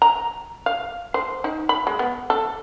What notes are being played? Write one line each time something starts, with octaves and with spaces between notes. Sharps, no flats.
A#5
F5
C5
D#4
B5
G#3
B3
A4